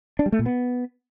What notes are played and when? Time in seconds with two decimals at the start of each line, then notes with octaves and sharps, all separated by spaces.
0.19 D4
0.26 G3
0.32 A3
0.39 A#2
0.46 B3